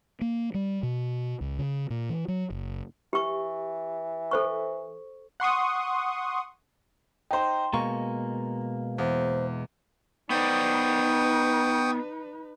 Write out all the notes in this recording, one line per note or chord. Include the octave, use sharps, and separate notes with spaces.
A#3
G3
B2
C#2
C#3
A#2
E3
F#3
F#1
E3 G4 C#6
A4 C5 C#6
F#5 C6 C#6 D#6
D#4 C5 G5 A#5 C6
B2 G#3 A#3 A#5 C#6
E2 C5
B3 D#4 B4 C5 D5 G5 C#6 D#6